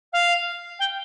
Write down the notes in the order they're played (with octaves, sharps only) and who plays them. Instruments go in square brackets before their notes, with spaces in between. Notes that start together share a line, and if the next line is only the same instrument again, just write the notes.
[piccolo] F5
G5